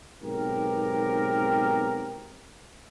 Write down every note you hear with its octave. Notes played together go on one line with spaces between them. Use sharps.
B1 G#2 B3 C4 G4 A#4